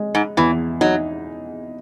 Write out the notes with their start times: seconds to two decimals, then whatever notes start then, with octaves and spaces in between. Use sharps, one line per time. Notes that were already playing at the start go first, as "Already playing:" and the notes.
Already playing: G#3
0.15 G#2
0.37 E2 E3
0.81 F#3 D#4